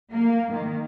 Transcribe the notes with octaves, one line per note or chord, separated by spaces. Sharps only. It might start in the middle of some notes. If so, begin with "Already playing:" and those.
A#3
D#3